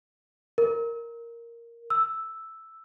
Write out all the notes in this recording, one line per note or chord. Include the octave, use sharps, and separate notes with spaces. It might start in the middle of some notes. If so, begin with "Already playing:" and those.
A#4
E6